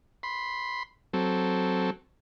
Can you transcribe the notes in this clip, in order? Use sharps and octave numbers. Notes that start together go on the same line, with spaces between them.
B5 C6
F#3 C4 A4